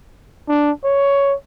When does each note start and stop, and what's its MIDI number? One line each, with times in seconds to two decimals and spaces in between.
0.48 0.71 62
0.84 1.34 73